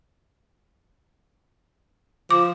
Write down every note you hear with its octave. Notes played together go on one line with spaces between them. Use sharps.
F3 D6